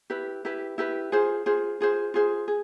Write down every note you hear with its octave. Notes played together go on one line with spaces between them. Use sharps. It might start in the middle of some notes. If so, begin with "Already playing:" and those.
E4 G4 B4
E4 G4 B4
E4 G4 B4
F4 G#4 C5
F4 G#4 C5
F4 G#4 C5
F4 G#4 C5
G#4